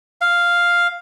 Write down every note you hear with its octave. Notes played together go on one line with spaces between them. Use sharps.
F5